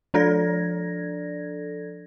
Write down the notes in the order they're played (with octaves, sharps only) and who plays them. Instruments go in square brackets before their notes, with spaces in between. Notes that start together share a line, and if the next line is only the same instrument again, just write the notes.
[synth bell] F3 D4 A4 D5 G#6 A#6